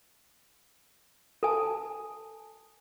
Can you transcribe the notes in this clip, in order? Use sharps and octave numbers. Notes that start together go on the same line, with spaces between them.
A4 G#5 A5